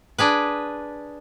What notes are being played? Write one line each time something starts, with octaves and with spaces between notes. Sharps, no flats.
D4 G#4 B4